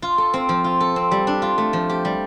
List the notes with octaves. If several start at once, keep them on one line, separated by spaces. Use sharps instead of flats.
F4
A4
C4
F3
F4
A4
C4
G3
D4
F4
A3
F3
G4
G3